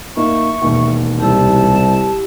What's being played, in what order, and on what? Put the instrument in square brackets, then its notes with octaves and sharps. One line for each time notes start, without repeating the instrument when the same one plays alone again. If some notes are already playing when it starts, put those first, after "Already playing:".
[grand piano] A2 A#3 D#4 [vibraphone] E5 [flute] C#6
[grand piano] E1 D#2
[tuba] C2 [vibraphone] E4 G4 [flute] A5